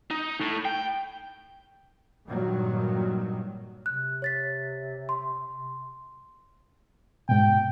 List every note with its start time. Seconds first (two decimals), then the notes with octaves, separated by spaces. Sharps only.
0.11 D#4
0.41 A2
0.65 G5
2.27 G2 A#2 D#3 F#3
3.86 C3 F#6
4.22 C#5 A6 B6
5.09 C6
7.29 G#2 B2 G5